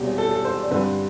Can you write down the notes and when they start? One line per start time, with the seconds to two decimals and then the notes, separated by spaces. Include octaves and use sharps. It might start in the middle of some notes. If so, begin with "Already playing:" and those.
Already playing: E1 E2 C3 G3
0.18 A4
0.31 A4
0.45 C5
0.58 D5
0.71 G2 D3 G3 C4 B4